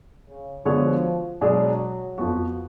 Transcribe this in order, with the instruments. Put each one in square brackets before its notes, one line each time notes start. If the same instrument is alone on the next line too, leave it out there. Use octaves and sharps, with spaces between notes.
[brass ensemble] C#3
[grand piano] D3 G#3 B3 F#4 C#5 [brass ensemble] F3
[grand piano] B2 G#3 D4 G#4 [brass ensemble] F#3
[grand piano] F2 F3 B3 F#4